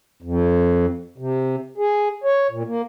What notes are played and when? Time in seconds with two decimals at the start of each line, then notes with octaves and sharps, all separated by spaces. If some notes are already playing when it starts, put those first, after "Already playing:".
0.22 F2
1.18 C3
1.78 G#4
2.24 C#5
2.51 A#2
2.67 A#3